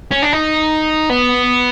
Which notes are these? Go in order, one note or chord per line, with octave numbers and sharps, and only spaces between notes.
C#4
D4
D#4
B3